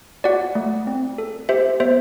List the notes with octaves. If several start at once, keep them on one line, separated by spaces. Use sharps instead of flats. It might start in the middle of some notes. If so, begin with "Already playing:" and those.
F#4 D5 F#5
A3
C4
A4
G4 C5 E5
B3 C5 E5